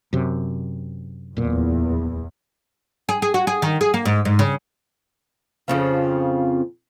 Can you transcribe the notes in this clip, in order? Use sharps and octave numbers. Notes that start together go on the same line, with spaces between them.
F#2 C3
D1 E2 A#2
G#4
G#4
F#4
G#4
D#3
G#4
A#3
G#2
G#2
C#3
F2 C#3 F3